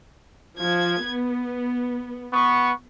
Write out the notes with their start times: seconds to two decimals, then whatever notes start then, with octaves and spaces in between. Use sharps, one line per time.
0.58 F3 G#6
1.03 B3
2.33 B3 C#6